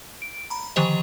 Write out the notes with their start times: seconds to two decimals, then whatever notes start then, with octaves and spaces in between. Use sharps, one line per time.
0.22 D7
0.50 A#5 B5
0.76 D3 D#3 F3 G4 C5 D#5